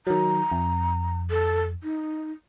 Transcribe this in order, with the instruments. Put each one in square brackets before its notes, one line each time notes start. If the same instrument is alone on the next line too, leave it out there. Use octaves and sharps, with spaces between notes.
[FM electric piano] D#3 F#3 [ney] A#5
[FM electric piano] F2
[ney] A4
D#4